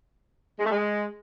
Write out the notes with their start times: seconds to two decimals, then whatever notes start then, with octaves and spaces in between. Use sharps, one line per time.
0.59 G#3
0.65 A3
0.71 G#3